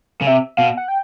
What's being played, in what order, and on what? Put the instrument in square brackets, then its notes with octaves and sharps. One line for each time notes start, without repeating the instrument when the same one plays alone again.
[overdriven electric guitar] C#3
[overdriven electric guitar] C3 [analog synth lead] E5
[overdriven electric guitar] B2 [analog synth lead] F5
[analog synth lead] F#5
G5